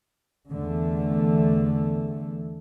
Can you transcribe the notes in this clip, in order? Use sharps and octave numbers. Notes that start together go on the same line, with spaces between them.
E2 D3 A3